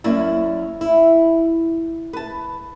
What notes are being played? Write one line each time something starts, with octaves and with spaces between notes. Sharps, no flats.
F#2 A#3 C#4 E4 D5 E5
E4
B4 A5